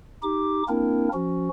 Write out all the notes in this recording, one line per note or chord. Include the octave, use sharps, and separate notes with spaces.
D#4 G4 D6
A#3 C4 D4 E4 A#4
F3 C#4 F#4